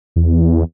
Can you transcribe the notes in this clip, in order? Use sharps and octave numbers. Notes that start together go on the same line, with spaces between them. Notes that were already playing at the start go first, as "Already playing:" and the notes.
E2